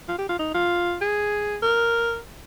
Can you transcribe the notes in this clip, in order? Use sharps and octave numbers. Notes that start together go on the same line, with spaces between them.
F4
G4
F4
D#4
F4
G#4
A#4